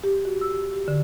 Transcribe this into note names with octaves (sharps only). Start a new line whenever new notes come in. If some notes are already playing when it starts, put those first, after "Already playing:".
G4
F#4
E6
G4
D3